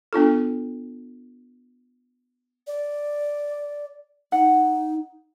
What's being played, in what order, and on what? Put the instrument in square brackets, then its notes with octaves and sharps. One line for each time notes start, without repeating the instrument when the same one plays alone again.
[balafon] B3 D4 F4 A4
[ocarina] D5
[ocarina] D#4 [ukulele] F#5